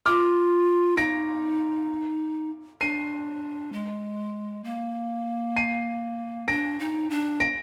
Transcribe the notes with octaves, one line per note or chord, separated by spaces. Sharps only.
F4 D6 F6
D#4 A#6 D7
D4 C7 D#7
G#3
A#3
C7 D#7
D4 A#6 D7
D#4
D4
A#6 D7